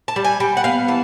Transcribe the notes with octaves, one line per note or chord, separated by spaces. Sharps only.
A5
G3
G#5
G3 G5
F#5
B3 F5
E3 A5